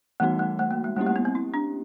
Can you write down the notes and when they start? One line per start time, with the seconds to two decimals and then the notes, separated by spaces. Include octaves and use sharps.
0.20 E3 G3 A3 B3 D#4 F#4
0.39 A3
0.59 A3
0.71 A#3
0.84 G#3
0.96 G3 A3 A#3 C#4 E4 G4
1.06 A3
1.16 B3
1.25 C4
1.35 E4
1.54 D4